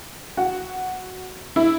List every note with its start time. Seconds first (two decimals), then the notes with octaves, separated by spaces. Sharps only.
0.37 F#4
1.56 E4